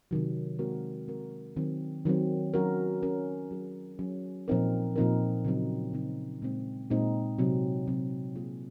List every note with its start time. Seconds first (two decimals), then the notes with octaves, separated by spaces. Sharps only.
0.11 C3 D#3 F#3
0.59 G#3 C4 F#4 A#4
1.08 G#3 C4 F#4 A#4
1.56 D#3 F#3 C4
2.06 D#3 F#3 C4
2.54 F#3 C#4 F#4 A#4
3.03 F#3 C#4 F#4 A#4
3.51 F#3 C#4 G#4
3.99 F#3 C#4 G#4
4.48 A#2 F3 C4 D#4 A#4
4.96 A#2 F3 C4 D#4 A#4
5.44 C#3 F#3 C4 D#4
5.93 C#3 F#3 C4 D#4
6.42 A#2 G#3 C4 D#4
6.90 A#2 G#3 C4 D#4
7.39 C3 F#3 C4
7.87 C3 F#3 C4
8.36 F#3 A#3 F4 G#4